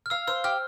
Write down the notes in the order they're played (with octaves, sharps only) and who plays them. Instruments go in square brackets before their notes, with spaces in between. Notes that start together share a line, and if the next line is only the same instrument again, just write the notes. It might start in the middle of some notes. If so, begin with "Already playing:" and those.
[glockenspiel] F6
[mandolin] F5 [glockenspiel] E6
[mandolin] C5 [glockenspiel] E6
[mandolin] G4 [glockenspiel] F6